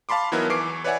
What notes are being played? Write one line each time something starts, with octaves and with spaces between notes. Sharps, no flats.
F5 A5 B5 C6 D6
E3 F#3 B3 D#4 E4 A#4
E2 E3 C#6 D6 C7 D7
B4 C#5 D5 E5 F#5 G#5